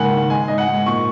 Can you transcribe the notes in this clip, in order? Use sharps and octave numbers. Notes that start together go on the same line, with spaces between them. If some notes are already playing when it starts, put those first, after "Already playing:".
Already playing: G#2 C#3 A#3 F#5 G#5
D#3
G#3 G#5
G#2 D#5
F#5
G#2
A#2 C#6